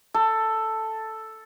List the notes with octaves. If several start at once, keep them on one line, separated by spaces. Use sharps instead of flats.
A4